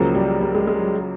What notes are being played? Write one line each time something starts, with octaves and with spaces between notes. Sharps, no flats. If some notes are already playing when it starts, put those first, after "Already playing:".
Already playing: C#2 C#3 F3 F#3 A#3
G3
G3
G#3
G#3
F#3